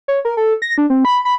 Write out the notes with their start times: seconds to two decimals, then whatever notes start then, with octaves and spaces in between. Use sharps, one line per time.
0.08 C#5
0.25 A#4
0.37 A4
0.62 A#6
0.78 D4
0.90 C4
1.05 B5
1.25 B5